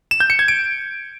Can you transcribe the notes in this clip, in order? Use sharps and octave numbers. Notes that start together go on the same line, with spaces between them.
E7
G6
C#7
G#6
D7